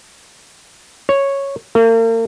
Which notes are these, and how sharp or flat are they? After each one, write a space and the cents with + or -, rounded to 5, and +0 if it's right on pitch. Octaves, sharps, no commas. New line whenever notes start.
C#5 -5
A#3 -40